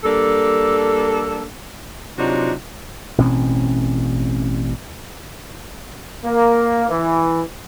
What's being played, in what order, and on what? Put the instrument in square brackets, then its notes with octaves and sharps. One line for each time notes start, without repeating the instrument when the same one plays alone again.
[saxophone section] G3 A#3 D4 A4
C3 F#3 D4 D#4 F4 F#4
[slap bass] A1 B2 C4 C#4
[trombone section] A#3
E3